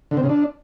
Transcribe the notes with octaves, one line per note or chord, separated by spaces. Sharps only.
D3
C4
C#3
D4